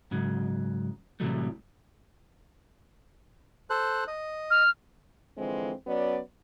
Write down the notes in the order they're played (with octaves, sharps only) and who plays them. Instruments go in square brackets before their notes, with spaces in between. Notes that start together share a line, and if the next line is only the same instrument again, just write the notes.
[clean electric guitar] G#2 C#3 F#3
A2 C3 E3 F#3 G3 A3
[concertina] A4 C5 F#6
D#5
[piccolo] F6
[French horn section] D3 E3 F3 G#3 C4
F#3 B3 C#4 D5